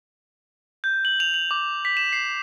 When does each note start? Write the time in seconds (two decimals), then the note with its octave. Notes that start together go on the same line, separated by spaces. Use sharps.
0.84 G6
1.05 F#7
1.20 F7
1.34 F#7
1.51 D6
1.85 B6
1.97 E7
2.13 C7